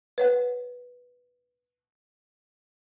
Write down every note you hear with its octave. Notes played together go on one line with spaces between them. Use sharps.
B4 C#5 F#5